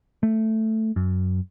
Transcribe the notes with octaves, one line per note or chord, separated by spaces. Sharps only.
A3
F#2